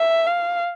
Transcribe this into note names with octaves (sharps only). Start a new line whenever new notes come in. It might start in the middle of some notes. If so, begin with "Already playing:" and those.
Already playing: E5
F5